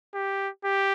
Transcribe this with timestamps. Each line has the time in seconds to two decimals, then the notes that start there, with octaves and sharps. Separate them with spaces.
0.14 G4
0.64 G4